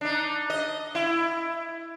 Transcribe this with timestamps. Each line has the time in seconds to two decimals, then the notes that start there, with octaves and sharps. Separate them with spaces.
0.01 D4 D#4
0.50 D#5
0.95 E4